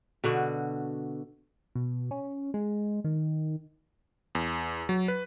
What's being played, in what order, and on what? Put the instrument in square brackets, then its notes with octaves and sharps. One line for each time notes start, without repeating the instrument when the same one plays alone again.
[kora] B2 D3 F#4
[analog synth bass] B2
C#4
G#3
D#3
[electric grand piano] E2
F#3
B4